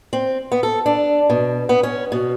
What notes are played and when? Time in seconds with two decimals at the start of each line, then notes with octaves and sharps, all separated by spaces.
0.13 C4
0.52 B3
0.63 A4
0.86 D4
1.30 B2
1.69 B3
1.83 C#4
2.12 B2